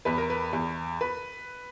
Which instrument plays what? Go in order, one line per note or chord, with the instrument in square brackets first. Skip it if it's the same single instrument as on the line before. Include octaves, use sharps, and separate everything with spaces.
[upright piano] E2 B4
A#4
B4
E2
B4